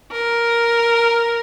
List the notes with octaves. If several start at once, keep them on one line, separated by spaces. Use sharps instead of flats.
A#4